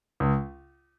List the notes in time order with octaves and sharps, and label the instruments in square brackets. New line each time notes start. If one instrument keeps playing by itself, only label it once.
[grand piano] C#2